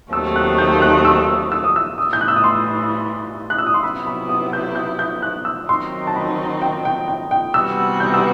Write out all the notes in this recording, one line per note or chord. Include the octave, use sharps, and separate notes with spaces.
D#2 D#3 F#3 A3 C4 E6
F#6
G6
F#6
E6
E6
D#6
E6
A2 E3 G3 D#6
G6
F#6
E6
D#6
C6
F#6
E6
D#6
C6
C3 F#3 B3 E4 B5
B5
D#6
G6
G6
G6
F#6
E6
D#3 F#3 C4 D#4 C6
A5
B5
G5
G5
G5
G5
C3 E3 G3 B3 F#4 E6
G6
E6